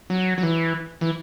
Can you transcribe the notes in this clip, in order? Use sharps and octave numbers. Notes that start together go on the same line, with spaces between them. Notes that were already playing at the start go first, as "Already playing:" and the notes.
F#3
F#3
E3
E3